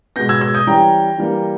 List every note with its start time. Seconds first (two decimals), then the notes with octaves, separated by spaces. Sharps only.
0.16 B2 G#3 B3 G6 A#6
0.29 E6 G#6
0.41 E6 G#6
0.54 D#6 G6
0.67 E3 G3 C#4 G5 A#5
1.18 E3 G3 A#3